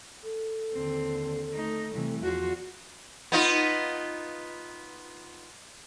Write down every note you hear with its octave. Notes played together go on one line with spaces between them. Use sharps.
A4
D#2 D3 C4
A3 D#4
C3 E3 G3 A3
E2 F3 F4 F#4
B3 D#4 F4